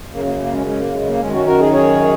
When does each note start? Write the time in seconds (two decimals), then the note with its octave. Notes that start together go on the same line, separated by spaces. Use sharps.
0.12 F#2 C#3 A#3
0.25 A#3
0.39 A#3
0.52 G#3 C#4
0.66 G#3 C#4
0.79 A#3
0.93 G#3
1.07 A#3
1.19 F#2 D#3 G#3 C#4
1.33 C#4 F#4
1.46 F#4 A#4
1.60 D#4 G#4
1.73 G#4 C#5